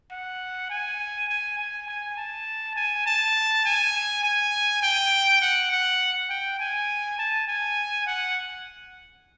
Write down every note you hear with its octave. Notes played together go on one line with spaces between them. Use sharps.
F#5
G#5
G#5
G#5
G#5
A5
G#5
A5
G#5
G#5
G5
F#5
F#5
G5
G#5
A5
G#5
F#5